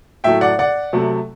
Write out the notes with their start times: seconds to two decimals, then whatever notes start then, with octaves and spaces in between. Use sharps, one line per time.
0.24 A2 F#3 A3 E5 G5
0.41 D5 F#5
0.59 D5 F#5
0.93 C3 F#3 A3